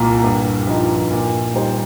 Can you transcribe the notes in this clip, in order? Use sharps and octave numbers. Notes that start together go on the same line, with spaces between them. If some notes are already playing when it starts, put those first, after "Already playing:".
Already playing: C2 A#2 A#3
G2
F3 D#4
A#2
G3 D#4 C5